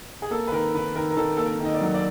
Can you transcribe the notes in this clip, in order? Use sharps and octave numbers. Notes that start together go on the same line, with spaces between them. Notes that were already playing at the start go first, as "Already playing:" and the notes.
G#4
A#3 A4
B4
D#3 A#4
D#3 B4
D#3 A#4
A#4
D#3 A4
A#3 A4
A#4
D#3 D#5
D5
F#3
D5